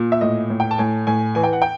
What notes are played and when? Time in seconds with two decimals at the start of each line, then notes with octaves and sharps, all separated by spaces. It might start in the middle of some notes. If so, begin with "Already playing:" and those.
Already playing: A#2
0.12 E5
0.21 A2 D#5
0.50 A2
0.60 G5
0.71 A5
0.78 A2 G#5
1.07 A2 G#5
1.35 E3 G#5
1.44 G5
1.53 F#5
1.62 G5